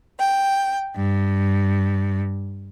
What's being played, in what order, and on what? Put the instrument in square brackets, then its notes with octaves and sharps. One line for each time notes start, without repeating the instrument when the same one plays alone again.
[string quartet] G5
G2